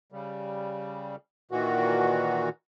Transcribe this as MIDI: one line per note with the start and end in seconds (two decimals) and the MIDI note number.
0.12 1.16 49
0.12 1.16 55
1.51 2.49 46
1.51 2.49 51
1.51 2.49 52
1.51 2.49 66